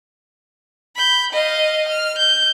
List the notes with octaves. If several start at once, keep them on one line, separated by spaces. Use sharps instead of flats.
B5 G6
D#5 F5
F6
G6